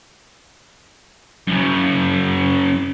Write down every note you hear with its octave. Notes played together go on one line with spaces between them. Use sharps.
F#2 C#3